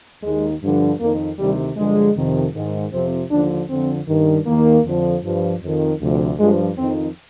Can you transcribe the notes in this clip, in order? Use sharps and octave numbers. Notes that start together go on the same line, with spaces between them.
D#2 D#3 G#3
G2 D3 F3
F2 D#3 A#3
D2 C3 D#3 G3
G2 D3 F3 G#3
F2 C3 D#3
G#2 D#3
F2 C3 F3 C4
D#2 D3 F3 D4
F2 D3 F3 C4
G2 D#3
D#2 D#3 A#3
F2 D3 F3
G2 F3
F2 D#3
D2 C3 F3
G2 F3 G#3
F2 D#3 C4